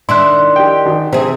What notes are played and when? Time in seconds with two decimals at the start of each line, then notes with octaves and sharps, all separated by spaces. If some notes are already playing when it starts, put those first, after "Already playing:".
0.09 D#3 D4 E4 C6 F#6
0.56 G4 G5
0.86 G#1
1.13 C3 E3 C4 G#4